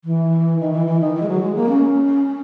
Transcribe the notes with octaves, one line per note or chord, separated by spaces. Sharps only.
E3
D#3
E3
E3
D#3
E3
G#3
F#3
G#3
A#3
C#4